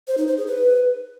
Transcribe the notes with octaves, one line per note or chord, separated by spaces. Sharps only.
C5
D#4
C5
G#4
B4